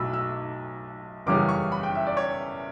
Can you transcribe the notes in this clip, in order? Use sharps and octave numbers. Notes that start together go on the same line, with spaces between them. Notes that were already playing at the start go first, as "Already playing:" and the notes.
Already playing: B1 F#3 A3 B5 E6
E6
F#1 E2 C#3 G3 C#4 D6
C#6
B5
G5
E5
D5
C#5